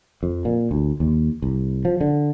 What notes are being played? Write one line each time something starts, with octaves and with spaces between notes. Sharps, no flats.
F2
A#2
D2
D#2
C2
F3
D3